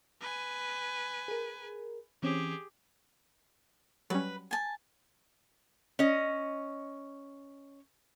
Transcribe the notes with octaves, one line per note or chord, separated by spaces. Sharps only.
B4 G#5
G#4 A#4
E3 C4 C#4 G4 G#4
F#3 G3 C#4 B4
G#5 A5
C#4 D#5